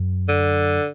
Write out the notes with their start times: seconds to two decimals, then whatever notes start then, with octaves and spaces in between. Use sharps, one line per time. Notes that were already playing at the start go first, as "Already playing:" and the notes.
Already playing: F#2
0.29 D3